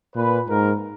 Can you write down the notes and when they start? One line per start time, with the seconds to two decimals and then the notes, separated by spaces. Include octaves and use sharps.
0.16 A#2 B4
0.49 G#2 A#4